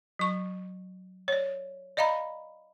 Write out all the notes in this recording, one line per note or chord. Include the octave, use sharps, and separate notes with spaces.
F#3 C#6
C#5 D5
D5 D#5 F5 A#5 B5